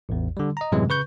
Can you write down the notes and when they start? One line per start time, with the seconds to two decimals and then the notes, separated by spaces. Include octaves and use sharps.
0.09 A1 E2
0.37 D3 G3
0.57 D#5 A#5
0.72 F#2 A2 C3 E3 F#3 G#3
0.89 C#3 B4 C#6 G6